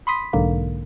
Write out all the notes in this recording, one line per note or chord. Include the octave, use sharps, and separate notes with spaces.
B5 C6 D#6 B6
B1 G#2 D3 A#3